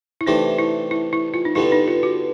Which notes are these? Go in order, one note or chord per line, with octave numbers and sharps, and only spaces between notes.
E4
C3 E3 A3 D4 D#4 G4
E4
E4
E4
F4
D#4
G2 D3 G3 B3 E4
D#4
F4
F#4